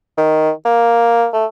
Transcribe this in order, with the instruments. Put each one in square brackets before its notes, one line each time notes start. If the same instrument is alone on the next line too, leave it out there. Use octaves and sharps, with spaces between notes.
[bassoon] D#3
A#3
A3